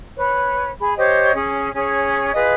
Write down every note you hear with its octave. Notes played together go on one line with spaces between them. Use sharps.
B4 C#5
G#4 B5
G4 C5 C#5 D#5
C#4 G#4
C#4 G#4 C#5 G#6
F4 G#4 B4 D#5